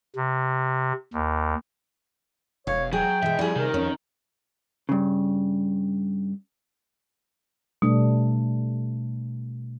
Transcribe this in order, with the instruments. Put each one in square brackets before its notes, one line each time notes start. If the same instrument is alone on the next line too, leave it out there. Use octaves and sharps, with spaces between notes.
[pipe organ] C3
D#2
[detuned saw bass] E1 [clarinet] C#5 [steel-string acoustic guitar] F5
[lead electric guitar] F#3 [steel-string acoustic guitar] G#4 [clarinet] G5
[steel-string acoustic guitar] B2 G#3 [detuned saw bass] E3 [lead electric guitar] E5
[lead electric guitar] F2 [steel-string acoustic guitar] G3 G#4 [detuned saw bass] E4
[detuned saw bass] C3 [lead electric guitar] D#3 [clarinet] A#4
[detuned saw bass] F2 [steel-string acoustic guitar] C#4
[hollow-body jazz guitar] G2 C#3
[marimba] B2 [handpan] G3 A3 D4